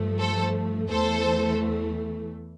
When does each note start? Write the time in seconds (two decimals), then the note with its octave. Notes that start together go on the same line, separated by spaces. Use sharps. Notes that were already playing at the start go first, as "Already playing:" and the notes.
Already playing: G2 F3 A3
0.19 A4 C5
0.89 E2 E3 A3 A4 C5